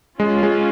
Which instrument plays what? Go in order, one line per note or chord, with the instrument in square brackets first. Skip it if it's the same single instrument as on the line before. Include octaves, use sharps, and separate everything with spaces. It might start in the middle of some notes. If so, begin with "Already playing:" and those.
[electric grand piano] G#3 [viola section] C#4 F4
[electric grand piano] G#3